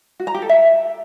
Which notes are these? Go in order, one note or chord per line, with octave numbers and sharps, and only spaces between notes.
F#4
A#5
G4
A4
E5